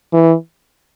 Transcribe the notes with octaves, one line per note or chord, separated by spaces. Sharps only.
E3